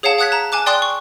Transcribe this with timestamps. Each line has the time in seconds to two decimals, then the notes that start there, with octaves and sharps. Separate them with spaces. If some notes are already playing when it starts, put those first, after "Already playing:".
0.03 G#4 C#5 F5 F#5 A5
0.19 F#5 D#6 F#6 G#6 B6
0.32 A5 A#5
0.52 G#5 A5 D6 F#6
0.66 D5 G5 C6 D#6 F#6 A6
0.82 C#6